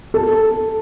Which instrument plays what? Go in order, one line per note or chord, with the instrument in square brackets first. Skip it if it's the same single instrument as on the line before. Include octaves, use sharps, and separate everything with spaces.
[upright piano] A4